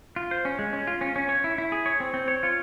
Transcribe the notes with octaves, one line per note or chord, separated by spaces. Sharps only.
F4
C5
C#4
G#3
C#4
F4
C#4
C#4
C#5
E4
E4
G#4
C#5
C4
C4
C#5
F4